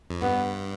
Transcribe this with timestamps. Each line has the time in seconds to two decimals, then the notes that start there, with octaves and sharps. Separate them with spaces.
0.10 F2
0.21 G2 B3